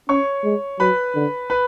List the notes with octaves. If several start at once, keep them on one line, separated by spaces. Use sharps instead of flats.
C#4 C#5 C#6
G#3
F#3 B4 B5
D3
B4 B5